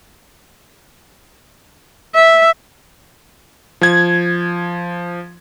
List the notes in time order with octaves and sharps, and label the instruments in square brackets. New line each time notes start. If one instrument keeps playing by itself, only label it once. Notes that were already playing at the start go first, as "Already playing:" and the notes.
[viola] E5
[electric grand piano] F3 G#6